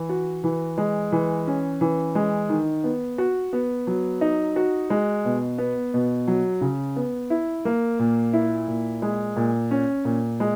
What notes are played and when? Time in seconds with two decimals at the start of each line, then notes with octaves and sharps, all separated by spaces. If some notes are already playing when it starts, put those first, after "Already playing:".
Already playing: E3
0.09 F#4
0.44 E3
0.78 G#3
1.12 E3
1.47 C#4
1.81 E3
2.15 G#3
2.49 D#3
2.84 B3
3.18 F#4
3.53 B3
3.87 F#3
4.21 D#4
4.56 F#4
4.90 G#3
5.25 B2
5.58 B3
5.94 B2
6.28 F#3
6.61 C#3
6.96 B3
7.30 E4
7.65 A#3
7.99 A#2
8.33 E4
8.68 A#2
9.02 G#3
9.36 A#2
9.71 C#4
10.05 A#2
10.40 G#3